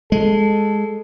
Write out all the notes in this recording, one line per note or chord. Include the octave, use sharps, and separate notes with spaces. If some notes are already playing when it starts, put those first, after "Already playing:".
G#3 A4